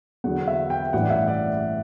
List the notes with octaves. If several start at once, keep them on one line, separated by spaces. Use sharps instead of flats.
E2 D3 F#3 F#5
E5
G5
A1 G2 E3 G3 F#5
D5
E5
D5